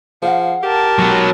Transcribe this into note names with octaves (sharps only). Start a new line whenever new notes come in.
F3 G#4 F5 F#5
G4 A#4 A5
F#3 G#3 B3